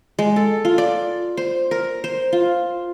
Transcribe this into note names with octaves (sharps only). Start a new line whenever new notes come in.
G#3
A4
F4
D5
C5
A#4
C5
F4